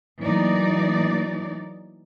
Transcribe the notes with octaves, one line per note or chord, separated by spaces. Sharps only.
E3 F#3 A3 A#3 D#4 D5